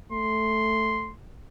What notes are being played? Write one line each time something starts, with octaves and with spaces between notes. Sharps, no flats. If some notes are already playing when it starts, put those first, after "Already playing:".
A3 C6